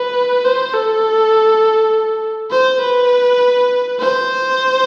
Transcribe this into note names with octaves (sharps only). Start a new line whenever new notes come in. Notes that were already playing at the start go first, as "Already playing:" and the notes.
Already playing: B4
C5
A4
C5
B4
C5